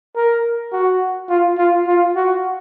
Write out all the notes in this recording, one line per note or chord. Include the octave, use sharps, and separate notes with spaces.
A#4
F#4
F4
F4
F4
F#4